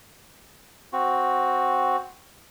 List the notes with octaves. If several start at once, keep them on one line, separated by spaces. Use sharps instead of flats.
C4 F#4